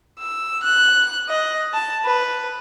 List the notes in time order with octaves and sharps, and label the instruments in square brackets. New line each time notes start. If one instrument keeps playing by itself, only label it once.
[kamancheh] E6
F#6
D#5
A5
B4